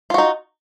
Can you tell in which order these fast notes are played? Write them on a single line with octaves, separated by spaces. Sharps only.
F4 F#4 D#4